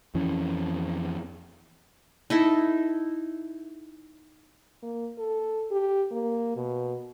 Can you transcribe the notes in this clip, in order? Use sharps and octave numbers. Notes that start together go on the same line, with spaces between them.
F2 E3 C#4
D#4 E4 A4
A#3
A4
G4
A#3
B2